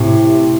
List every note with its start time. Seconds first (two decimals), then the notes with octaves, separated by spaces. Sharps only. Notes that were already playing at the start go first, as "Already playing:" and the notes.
Already playing: A2 C3 G4